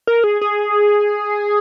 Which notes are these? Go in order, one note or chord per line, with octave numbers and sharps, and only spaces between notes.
A#4
G#4
G#4